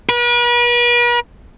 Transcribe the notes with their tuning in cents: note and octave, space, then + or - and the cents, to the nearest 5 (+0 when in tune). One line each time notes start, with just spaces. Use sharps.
B4 -45